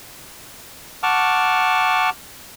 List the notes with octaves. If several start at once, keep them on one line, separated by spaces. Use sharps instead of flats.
F#5 A5 C#6 D6 F6